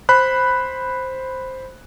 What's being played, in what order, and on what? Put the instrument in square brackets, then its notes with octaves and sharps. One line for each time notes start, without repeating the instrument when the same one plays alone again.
[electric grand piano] C5 B5 F#6